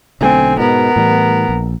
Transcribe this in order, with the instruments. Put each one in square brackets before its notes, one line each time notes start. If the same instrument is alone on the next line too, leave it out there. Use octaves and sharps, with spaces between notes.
[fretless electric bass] B1 D3 A3 [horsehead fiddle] C4 G#5
[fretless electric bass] G#2 B2 [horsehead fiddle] B3 A#4
[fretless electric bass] A2 E3 G3
A#1